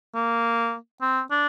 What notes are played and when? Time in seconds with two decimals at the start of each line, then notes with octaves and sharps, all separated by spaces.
0.15 A#3
1.01 C4
1.31 D4